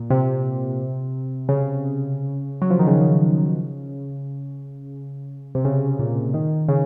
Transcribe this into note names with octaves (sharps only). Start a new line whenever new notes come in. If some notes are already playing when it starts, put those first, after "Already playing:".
Already playing: A#2
C3
C#3
F#3
F3
D#3
C#3
C3
C#3
A#2
D#3
C#3